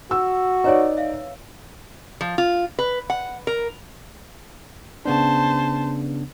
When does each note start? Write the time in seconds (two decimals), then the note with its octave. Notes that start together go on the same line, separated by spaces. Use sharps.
0.11 F#4 E6
0.64 D#4 B4 C#5 D5 G#5
0.97 E5 F5
2.21 F3
2.38 F4
2.79 B4
3.10 F#5
3.47 A#4
5.05 C#3 B3 D4 C5 A5